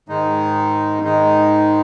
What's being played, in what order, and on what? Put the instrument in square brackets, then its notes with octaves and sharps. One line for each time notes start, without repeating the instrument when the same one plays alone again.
[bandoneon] G#2 D#3 G#3 D#4
G#2 D#3 G#3 D#4